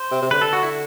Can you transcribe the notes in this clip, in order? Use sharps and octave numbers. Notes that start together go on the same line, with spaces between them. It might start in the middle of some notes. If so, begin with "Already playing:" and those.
Already playing: C5
C3
C3
D3 B4
A4
F#4
E4